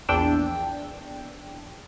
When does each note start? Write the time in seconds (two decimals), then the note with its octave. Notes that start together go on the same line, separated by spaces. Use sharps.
0.09 A#1 E2 D4 G5 E6